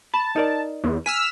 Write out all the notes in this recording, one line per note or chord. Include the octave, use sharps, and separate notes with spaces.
A5 B5
D#4 A#4 D5
E2
G#5 E6 F6 B6